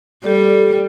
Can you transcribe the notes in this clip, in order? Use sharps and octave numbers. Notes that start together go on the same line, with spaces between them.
G3 G4 A4 D5